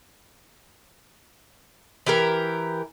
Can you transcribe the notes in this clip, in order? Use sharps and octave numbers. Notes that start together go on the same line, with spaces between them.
E3 G4 A#4